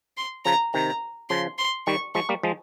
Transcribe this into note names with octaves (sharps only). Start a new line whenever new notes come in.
C6
C#3 F3 A#5
C3 D#3 A#5
C#3 F3 C6
C6
D#3 G3 C#6
F3 G#3 C#6
G3 A#3
F3 G#3